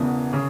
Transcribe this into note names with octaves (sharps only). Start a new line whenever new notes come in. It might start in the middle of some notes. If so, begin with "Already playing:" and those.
Already playing: E1 E2 C#3 E3 B3
C#3